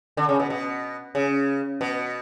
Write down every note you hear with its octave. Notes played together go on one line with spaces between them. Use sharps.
D3
C#3
B2
B2
C#3
B2